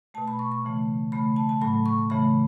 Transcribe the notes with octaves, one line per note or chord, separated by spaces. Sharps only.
B2 A3 A5
B5
C#6
C#6
C#3 E3 A3
C#3 A3 B5
A5
A5
A2 F#3 A3 B5
C#6
C#3 E3 A3 B5